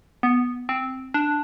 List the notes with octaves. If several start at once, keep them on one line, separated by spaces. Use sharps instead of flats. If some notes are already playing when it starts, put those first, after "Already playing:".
B3
C4
D4